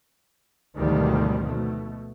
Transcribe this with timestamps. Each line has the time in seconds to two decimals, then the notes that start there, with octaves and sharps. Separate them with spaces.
0.76 G#1 D2 B2 D#3 F3 G3
1.46 B2 A3